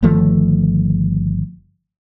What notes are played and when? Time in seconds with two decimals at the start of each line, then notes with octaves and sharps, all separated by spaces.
0.03 G1 D#3 F3 A3